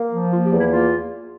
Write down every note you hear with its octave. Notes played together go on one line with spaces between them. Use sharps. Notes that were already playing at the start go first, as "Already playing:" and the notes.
Already playing: A#3
F3
A#3 F4
G4
E2
E4
A#3 F4